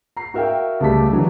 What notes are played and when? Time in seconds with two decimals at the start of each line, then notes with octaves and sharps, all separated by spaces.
0.17 A#5 C7
0.34 F#4 A#4 E5 F5 G5
0.80 C#2 G3 A3 A5 D6 B6
1.12 D3 E3 F#3